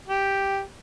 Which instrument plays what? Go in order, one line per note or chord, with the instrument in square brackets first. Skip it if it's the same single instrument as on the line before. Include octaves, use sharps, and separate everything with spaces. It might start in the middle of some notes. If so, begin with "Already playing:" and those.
[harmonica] G4